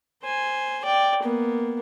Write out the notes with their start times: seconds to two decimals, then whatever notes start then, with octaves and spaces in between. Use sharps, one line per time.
0.23 C5 G#5
0.85 D5 G5
1.23 A#3 B3